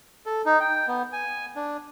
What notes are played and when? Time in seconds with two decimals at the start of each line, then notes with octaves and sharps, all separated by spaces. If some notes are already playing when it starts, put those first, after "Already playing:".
0.26 A4
0.46 D#4
0.60 G5
0.87 B3
1.13 G#5
1.56 D4